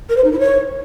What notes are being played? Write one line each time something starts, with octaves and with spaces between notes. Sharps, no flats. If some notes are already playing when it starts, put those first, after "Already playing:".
A#4
C5
D#4
E4
C#5